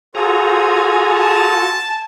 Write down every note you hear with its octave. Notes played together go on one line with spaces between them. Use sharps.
F4 F#4 G#4 A4 C5 G#5 A#5
A5